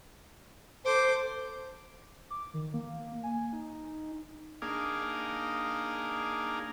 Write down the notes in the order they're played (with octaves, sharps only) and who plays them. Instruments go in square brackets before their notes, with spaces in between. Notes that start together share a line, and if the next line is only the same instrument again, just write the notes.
[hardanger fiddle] A4 D6 [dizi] C5
[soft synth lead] D6
D#3
A#3
G#5
D#4
[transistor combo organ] A#3 D4 D#4 G#4 F5